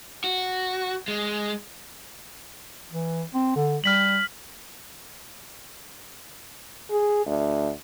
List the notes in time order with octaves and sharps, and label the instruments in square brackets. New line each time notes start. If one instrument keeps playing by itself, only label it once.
[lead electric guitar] F#4
G#3
[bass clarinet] E3
C4
D3
[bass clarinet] G3 [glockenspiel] F6 B6 F#7
[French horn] G#4
D2